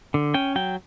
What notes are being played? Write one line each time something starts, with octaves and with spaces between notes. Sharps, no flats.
D3
C#4 G5
F#3 G5